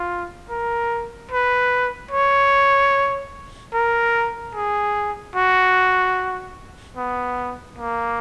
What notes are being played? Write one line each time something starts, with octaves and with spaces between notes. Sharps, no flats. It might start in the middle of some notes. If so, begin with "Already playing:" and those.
Already playing: F4
A#4
B4
C#5
A#4
G#4
F#4
B3
A#3